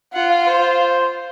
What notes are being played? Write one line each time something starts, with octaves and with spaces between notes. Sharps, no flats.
F4 F#5
F5
C5